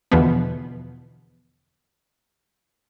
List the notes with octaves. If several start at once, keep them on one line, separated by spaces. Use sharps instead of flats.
E2 B2 D3 E3 F3 B3